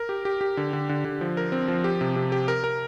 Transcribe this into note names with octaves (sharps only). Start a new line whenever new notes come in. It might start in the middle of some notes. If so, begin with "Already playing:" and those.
Already playing: A#4
G4
G4
G4
D3
D3
D3
D3
F3
A#4
C4
F3
G4
C3
C3
G4
A#4
A#4